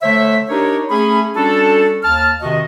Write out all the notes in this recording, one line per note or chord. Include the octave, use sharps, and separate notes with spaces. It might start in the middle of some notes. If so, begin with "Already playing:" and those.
D3 A3 C5 C#5 E5
D4 D#4 G4 A#4 C#5
A3 C#4 G#4 B5
G3 C#4 D4 F#4 A4
D#2 A5 F6
F2 C3 D#3 F#4 D#5